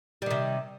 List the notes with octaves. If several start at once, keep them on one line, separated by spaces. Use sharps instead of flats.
C3 D#3 G3